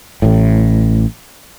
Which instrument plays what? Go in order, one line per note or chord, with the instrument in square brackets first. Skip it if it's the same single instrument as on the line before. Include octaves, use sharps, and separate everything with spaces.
[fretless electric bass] A1 A2